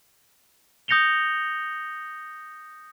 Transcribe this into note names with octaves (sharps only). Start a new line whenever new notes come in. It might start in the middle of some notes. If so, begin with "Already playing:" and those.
D#6 G6 A#6 C#7 F7 G7